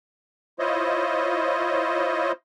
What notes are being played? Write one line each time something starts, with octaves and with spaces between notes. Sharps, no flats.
E4 F4 C5 C#5 D#5